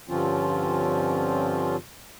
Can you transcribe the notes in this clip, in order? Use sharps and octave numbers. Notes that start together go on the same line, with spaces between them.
G2 D3 F3 C4 C#4 F4